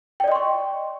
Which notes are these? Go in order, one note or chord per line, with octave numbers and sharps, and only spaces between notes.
D5 D#5 G5 C6 C#6